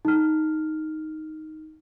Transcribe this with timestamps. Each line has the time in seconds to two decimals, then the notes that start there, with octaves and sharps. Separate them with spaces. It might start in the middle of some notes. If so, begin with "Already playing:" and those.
0.05 D#4 F6